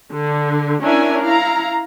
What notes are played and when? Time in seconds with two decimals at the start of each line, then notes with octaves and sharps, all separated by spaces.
0.11 D3
0.81 C#4 D4 E4 A#4 E5 G#5
1.20 E4 F5 A#5